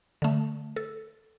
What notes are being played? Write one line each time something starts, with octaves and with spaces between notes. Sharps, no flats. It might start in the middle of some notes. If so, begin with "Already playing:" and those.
D3 A3
A4